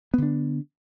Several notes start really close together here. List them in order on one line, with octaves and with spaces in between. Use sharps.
B3 D3 D4